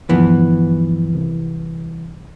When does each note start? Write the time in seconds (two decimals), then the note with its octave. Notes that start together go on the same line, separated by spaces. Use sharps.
0.09 D2 G2 E3 F3 B3
1.15 C2